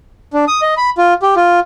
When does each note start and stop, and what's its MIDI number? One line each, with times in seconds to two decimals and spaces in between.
0.33 0.45 62
0.48 0.61 87
0.62 0.74 75
0.77 0.90 83
0.98 1.14 65
1.22 1.35 67
1.36 1.60 65